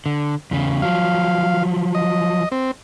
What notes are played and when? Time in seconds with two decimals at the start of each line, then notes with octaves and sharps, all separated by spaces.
0.06 D3
0.51 E2 C#3
0.82 F3 F#3 F5
1.95 D#5
2.52 C4